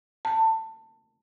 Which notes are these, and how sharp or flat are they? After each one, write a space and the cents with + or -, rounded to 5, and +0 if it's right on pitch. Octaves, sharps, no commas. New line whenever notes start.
A5 +20